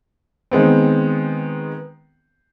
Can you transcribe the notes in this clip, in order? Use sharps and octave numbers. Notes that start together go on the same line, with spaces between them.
D#3 G#3 B3 C4